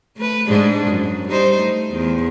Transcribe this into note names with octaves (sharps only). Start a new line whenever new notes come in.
A3 B4
G#2 D4 G#4
F#2
G3 D#4 C5
A3
E2